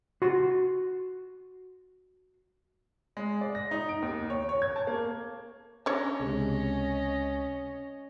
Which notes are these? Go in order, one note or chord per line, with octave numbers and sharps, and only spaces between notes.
F#4 C6
G#3
D5
A#6
D#4
D7
D#2
C#5
C#5
G#6
A5
A#3
C#4 D4 C#5 D#5
C#2 C3 G#3